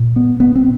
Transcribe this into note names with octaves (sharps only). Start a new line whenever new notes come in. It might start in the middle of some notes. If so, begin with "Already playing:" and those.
Already playing: A#2
B3
B3
C4